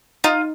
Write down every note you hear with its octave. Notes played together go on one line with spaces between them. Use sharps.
D#4 F4